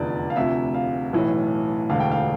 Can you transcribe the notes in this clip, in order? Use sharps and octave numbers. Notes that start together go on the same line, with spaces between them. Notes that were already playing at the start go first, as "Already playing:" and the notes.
Already playing: F1 E2 D3 F3 D5
F5
D2 C3 F3 E5
F5
B1 A2 E3
E1 D2 D3 F5
G5
F5